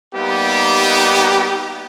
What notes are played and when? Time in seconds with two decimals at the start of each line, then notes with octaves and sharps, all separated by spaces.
0.15 G3 A#3 B3 D#4 G4